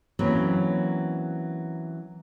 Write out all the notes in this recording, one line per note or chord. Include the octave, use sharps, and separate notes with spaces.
E3 F#3 A#3 C4 C#4 B4